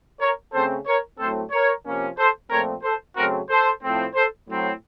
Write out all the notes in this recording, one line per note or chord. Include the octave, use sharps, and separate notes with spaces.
A#4 C#5
C#3 A3 C4 A4 C5
A#4 C#5
A2 F#3 A3 C4 A4 C5
A#4 C#5
C3 F3 A#3 C#4
A4 C5
A#2 F3 A3 C4 A#4 C#5
A4 C5
C#3 F#3 A3 C4 F#4 A#4
A4 C5
A2 F3 A3 C4
A4 C5
A2 F#3 C4